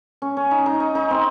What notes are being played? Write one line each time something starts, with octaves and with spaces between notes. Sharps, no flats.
C#4
C#4
D#4
D#4
D#4
D#4
C4